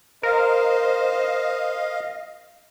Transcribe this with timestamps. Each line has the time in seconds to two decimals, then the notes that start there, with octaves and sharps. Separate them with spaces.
0.23 A#4 C5 D#5 F5